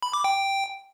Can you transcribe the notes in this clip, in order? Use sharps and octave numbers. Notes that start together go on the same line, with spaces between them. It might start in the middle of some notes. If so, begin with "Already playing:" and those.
B5
D6
G5